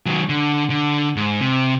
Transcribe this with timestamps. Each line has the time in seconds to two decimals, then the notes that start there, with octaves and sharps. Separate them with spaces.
0.06 D#3 F#3
0.29 D3
0.70 D3
1.16 G#2
1.41 C3